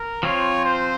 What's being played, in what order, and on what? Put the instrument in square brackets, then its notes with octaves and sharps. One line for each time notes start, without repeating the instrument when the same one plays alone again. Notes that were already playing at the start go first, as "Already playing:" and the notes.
Already playing: [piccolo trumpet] A#4
[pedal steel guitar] F3 C4 F4 [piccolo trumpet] C#5
[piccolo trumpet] C5